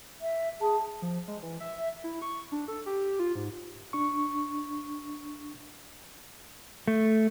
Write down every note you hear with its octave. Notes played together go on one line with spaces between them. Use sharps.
E5
G#4 A5
F3
G#3
E3
E5
E4
C#6
D4
A4
G4
F4
G#2
D4 C#6
A3